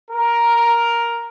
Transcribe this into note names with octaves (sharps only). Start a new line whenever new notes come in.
A#4